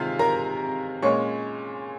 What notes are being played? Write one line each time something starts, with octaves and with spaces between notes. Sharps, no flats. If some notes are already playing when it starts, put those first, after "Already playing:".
Already playing: C3 D#3 G#3 F4 F5
A#4 A#5
A#2 G#3 C#4 C#5 C#6